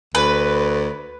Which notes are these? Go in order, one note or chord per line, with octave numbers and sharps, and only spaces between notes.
D2 B4